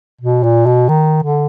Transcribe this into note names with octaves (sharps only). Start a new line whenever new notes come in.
B2
A#2
B2
D#3
D3